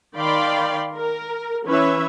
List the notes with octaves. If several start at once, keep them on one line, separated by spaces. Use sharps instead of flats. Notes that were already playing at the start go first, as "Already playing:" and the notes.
D#3 D5 F5 G5 B5 C6
A#4
E3 C#4 B4 C#5 E5